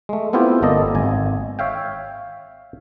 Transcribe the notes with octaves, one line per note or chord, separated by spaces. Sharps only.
G#3 A3
A3 B3 C4 E4 F4 G4
G1 A#3 A4 D5 D#5
G#1 G#5
C#5 E5 F5 G5